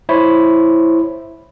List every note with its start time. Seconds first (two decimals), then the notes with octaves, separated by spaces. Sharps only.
0.09 E4 C5 C#5